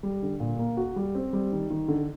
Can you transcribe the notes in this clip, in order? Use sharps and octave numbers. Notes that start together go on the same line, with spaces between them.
G3
D3
A#2
A#3
F#4
G3
C4
G3
D#3
D#3
D3